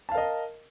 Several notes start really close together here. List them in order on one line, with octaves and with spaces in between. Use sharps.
A5 F5 A#4 D#5